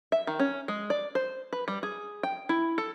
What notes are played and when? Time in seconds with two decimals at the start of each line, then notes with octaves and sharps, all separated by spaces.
0.12 E5
0.27 D#3
0.40 C#4
0.68 G#3
0.90 D5
1.15 C5
1.53 B4
1.68 G3
1.83 G#4
2.23 G5
2.49 E4
2.78 A4